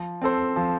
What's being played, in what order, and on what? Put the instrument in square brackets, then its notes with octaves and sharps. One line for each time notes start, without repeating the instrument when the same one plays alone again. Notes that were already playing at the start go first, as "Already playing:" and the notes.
Already playing: [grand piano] F3
C4 A4 C5
F3